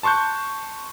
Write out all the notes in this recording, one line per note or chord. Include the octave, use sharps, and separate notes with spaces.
A5 C6 C#6 F#6 G6